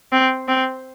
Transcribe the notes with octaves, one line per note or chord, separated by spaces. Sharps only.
C4
C4